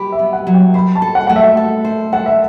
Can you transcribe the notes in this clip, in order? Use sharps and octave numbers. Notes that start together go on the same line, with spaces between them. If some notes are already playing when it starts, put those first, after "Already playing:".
Already playing: G4 B5
E5
B3
F#5
F#3
G5
C5 B5
A5
A4
F#5
A3 F#5
E5
A4
C5
A4 F#5
E5